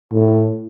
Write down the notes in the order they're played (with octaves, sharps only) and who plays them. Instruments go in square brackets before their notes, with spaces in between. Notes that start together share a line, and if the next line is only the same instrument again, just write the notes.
[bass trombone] A2